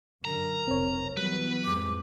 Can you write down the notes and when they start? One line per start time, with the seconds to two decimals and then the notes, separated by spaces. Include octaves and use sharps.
0.25 F#2 D3 A#4 A#5
0.68 F1 B1 C4 C#5
1.17 E3 F#3 G3 B3 B4
1.65 F2 A2 G#3 D6